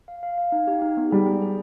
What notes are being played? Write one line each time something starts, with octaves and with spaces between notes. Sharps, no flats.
F5
F5
F5
D#4
G4
D#4
B3
G3 G#4
G#4
G#4